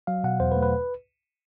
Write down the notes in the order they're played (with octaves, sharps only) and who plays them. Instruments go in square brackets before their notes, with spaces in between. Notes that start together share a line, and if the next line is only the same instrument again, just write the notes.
[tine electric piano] F#3 F5
B2 F#5
E2 C5
B4
A3
B4